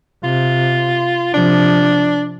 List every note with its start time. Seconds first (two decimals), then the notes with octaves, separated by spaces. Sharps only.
0.24 C3 F4
1.34 C3 F3 D4